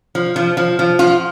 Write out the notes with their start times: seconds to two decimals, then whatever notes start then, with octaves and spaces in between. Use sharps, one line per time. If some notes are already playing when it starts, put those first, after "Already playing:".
0.15 F3
0.36 F3
0.57 F3
0.79 F3
0.99 F3 F4